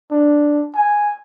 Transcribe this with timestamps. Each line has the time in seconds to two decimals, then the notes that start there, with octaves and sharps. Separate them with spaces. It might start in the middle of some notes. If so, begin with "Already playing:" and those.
0.11 D4
0.75 G#5